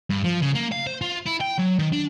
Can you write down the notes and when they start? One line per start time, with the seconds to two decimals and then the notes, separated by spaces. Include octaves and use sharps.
0.10 G2
0.24 F3
0.42 C#3
0.55 A#3
0.72 F5
0.87 C5
1.01 F4
1.26 E4
1.40 G5
1.58 F#3
1.79 D#3
1.93 D4